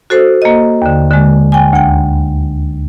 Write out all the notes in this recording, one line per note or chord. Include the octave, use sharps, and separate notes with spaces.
F#4 A4 C5
A#3 D#5
D#2 D3
D3 G#3
G5 G#5
D2 G5